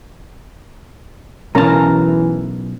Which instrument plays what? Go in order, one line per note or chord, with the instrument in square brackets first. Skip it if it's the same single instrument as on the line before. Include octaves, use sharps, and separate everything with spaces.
[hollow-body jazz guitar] B1 A5 [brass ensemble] E3 [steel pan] C#4 A#4 A#5